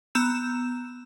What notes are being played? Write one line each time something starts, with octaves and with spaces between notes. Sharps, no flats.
B3 A#5 E6 G6 E7